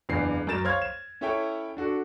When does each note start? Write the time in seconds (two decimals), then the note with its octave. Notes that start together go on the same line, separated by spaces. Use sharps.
0.09 F#1 E2 C#3 D4 C7
0.47 F#2 A#4 A6 E7
0.64 C5 C#5 F5 F6 G#6
0.82 E7
1.21 C#4 E4 A4 C#5 E5 G5
1.77 D4 F#4 A4